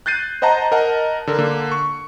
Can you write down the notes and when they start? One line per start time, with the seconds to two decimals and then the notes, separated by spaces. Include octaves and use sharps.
0.06 F#6 G6 A6 C7 D#7
0.42 C5 D#5 F#5 A5 A#5
0.72 A#4 D#5 F#5 A5
1.27 D3 A#4
1.39 D3 A#3
1.71 C#6